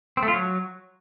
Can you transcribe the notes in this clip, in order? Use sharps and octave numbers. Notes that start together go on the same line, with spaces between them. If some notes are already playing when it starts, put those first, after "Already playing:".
C4
A3
F4
F#3